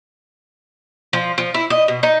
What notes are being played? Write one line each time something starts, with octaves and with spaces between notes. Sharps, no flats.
F3
F3
E4
D#5
B2
D#4